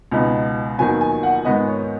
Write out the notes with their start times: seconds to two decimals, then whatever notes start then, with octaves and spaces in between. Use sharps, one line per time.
0.12 C#2 B2 B3 D#4
0.79 D#2 D#3 F#3 B3 G#5
1.01 G#5
1.23 F#5
1.45 G#2 D#3 G#3 B3 D#5
1.67 C#5